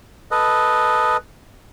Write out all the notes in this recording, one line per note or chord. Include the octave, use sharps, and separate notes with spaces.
A4 B4 D#5